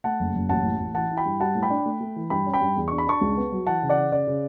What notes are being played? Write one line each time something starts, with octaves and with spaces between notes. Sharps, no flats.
A3 F#5 A5
F#1
F#1
A1 F#5 A5
A2
A1
E3 F#5 A5
E4
G5 B5
G2
G3 F#5 A5
A2
G5 B5
D4
A3
A3
E3
G2 G5 B5
C#4
G5 B5
G2
E2
D4 C#6
B5
D4 A5 C#6
C#2
B3
F#3
E3 F#5 A5
C#3
D5 F#5
C#3
C#3 D5
C#3